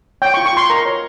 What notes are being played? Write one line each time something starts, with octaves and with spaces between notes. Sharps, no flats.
C#5 G5
C#6
F4
C#6
F4 C6
A#4 A#5
C#5